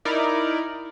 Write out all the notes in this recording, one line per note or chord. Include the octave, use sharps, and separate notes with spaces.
D#4 E4 A#4 D5